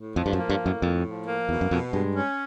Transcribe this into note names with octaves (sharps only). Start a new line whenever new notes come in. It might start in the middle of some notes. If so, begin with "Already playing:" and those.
Already playing: A2
F2 F3
G2
F#2
A#3
G2
A2
F#2
F2 A2
F3
A#3
E2 B2
F#2
F2 B2
G2 G#3
C#4